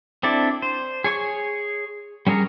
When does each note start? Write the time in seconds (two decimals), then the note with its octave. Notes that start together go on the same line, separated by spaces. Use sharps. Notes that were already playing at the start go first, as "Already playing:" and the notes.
0.23 C4 D4 E4 A4 D5
0.62 C5
1.04 G#4 C#5 G#5 C#6
2.27 G3 C#4 G#4 A#4 C#5